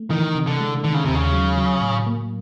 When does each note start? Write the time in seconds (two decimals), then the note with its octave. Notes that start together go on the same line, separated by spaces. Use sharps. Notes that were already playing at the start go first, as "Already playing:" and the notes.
Already playing: A3
0.11 D#3 E3
0.35 C3
0.47 D3
0.60 G#3
0.84 D3 D#3
0.94 C#3
1.05 D#2 C3
1.15 C#3
1.32 F#3
1.58 F#3
1.81 A2
2.06 A#3